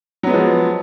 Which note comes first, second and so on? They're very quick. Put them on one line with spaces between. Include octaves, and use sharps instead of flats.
F#3 B3 G#3 F3